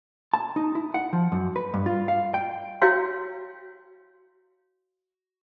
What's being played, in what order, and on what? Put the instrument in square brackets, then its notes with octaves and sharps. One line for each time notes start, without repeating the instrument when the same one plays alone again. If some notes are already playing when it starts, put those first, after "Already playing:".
[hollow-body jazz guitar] A5
D#4
E4
F#5
F3
F#2
B4
G2
F4
F5
G5
[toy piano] E4 F#4 C#5 F5 G5 C6